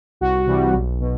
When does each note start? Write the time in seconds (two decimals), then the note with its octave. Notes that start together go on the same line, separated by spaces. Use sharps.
0.21 C2 F#4
0.46 C3 E3 G3
0.73 B1
1.00 B2